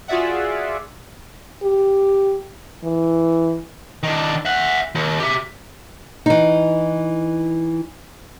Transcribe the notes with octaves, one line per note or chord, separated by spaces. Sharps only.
F4 F#4 G#4 D5 E5 F#5
G4
E3
D#3 D4
E5 F#5
D#2
G4 E5
E3 D#4